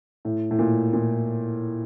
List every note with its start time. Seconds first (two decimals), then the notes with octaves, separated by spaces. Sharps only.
0.25 A2
0.51 A2
0.59 A#2
0.93 A#2